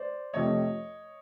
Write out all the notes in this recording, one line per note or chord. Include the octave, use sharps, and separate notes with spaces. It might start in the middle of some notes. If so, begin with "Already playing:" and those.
Already playing: C5 D5
F2 C3 F3 A3 C#5 D#5